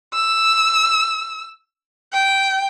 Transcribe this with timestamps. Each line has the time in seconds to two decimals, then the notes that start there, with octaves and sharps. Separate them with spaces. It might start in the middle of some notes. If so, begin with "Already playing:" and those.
0.14 E6
2.13 G5